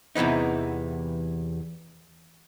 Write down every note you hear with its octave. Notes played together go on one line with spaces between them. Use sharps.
E2 C3 E3 B3 D#4